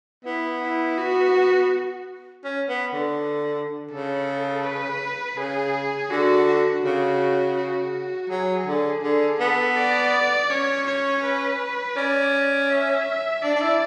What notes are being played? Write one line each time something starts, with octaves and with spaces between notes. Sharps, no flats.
B3 E4
E4
F#4
C#4
B3
D3
C#3 A4
B4
C#3 G#4
D3 F#4
F#4
C#3 F#4
F#4
F#3 G#4
D3
D3 G#4
B3 A4
D5
C#4 C#5
C#5
B4
C#4 D5
D5
E5
D4 D5
D4
E4